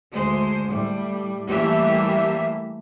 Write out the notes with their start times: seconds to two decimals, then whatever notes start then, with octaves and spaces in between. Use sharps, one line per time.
0.11 D2 G#3 C5
0.68 A2 G3
1.48 E3 G3 A3 A#3 G4 E5